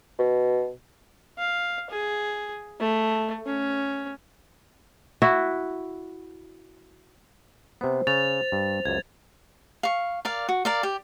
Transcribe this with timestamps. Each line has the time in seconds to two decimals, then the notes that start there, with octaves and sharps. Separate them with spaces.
0.19 B2
1.39 F5
1.90 G#4
2.80 A3
3.46 C#4
5.22 E4 F#4 E5
7.81 C3 B3 C5
8.07 C#3 A6 F7
8.52 G2
8.86 C#2 F#2 G#6
9.83 F5 C#6
10.25 A#4 D5 F5
10.49 F#4
10.65 A#4 D5 F5
10.83 G4